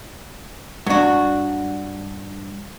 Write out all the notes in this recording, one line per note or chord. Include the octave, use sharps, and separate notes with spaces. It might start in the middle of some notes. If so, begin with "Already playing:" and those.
G2 F#3 D4 F#4